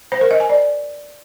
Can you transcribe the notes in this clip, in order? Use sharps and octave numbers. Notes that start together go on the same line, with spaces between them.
C5
A#4
D#5
G#5
D5